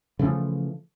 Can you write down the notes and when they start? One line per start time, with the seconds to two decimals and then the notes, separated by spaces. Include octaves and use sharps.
0.19 C#3 E3 F3 A3